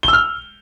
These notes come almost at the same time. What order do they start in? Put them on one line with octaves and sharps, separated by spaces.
G7 E6 F6